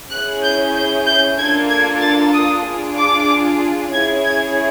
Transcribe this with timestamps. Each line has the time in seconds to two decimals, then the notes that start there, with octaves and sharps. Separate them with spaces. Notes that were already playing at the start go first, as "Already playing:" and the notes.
0.10 C#4 E4 G#4 F#6
0.43 G6
0.75 G6
1.06 G6
1.38 A#3 D4 F4 A4 G#6
1.70 G#6
2.01 A6
2.34 D#6
2.66 D4 F4 G#4
2.98 D6
3.93 C#4 E4 G#4 G#6
4.24 G#6